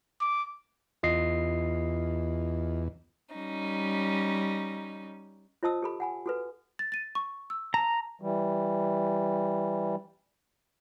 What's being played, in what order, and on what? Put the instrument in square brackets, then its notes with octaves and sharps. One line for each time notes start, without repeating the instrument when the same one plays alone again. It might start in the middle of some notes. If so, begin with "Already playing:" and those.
[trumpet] D6
[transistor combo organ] E2 [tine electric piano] F4 D#5 C7
[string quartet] G3 C#4 D#4
[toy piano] F4 C5 D#5 A5 D#6 E6
G4 A4 B5
F#5 G#5 B5
F#4 A4 B4
[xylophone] A6
A6 D#7
C#6
E6
[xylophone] A5 [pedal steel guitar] A#5
[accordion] E3 G3